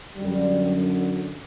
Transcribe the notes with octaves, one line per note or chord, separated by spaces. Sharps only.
F#2 D3 G3